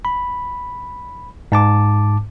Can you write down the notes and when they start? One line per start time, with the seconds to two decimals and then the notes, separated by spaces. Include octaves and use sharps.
0.05 B5
1.52 G#2 A5 D6